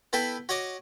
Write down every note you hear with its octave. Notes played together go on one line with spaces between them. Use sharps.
B3 E4 A4 B4 G5 A5
F#4 C#5 D#5 D6